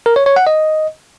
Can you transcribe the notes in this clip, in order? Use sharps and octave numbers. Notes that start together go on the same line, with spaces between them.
A#4
C#5
C#5
F#5
D#5